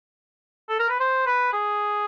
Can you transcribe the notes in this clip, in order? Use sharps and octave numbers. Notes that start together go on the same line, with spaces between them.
A4
A#4
B4
C5
B4
G#4